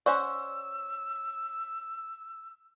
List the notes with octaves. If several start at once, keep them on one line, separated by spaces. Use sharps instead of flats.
C#4 C5 D5 F#5 C#6 E6